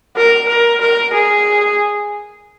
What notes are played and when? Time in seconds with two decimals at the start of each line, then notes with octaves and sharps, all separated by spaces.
0.17 A#4
0.49 A#4
0.81 A#4
1.13 G#4